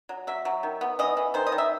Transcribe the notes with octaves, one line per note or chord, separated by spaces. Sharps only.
F#3
F#3 E5
F#3
D#3
B3
E3 D#5
E3
D#3 C5
D#5
D#3
E5